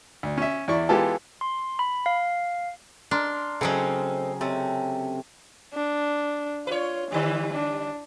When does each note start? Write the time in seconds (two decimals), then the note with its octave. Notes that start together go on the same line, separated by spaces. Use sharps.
0.23 D2
0.38 C#4 E5
0.68 E2 E4 D5 C#6
0.89 E3 G#3 B3 F4 G4 A4
1.41 C6
1.79 B5
2.06 F5
3.11 D4 A#4 C6
3.61 C#3 F#3 A3 C4 D#4 G#5
4.41 C3 A3 C#4
5.73 D4
6.67 F4 B4 C#5
7.12 D3 E3 G3
7.54 D4